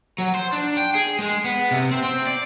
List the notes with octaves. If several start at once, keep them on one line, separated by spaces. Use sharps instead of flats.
F#3
C5
D4
G5
G#4
G#3
B3
C3
C4
C4
D5